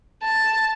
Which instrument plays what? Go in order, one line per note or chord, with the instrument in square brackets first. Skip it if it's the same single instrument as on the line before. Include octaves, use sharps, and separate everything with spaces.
[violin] A5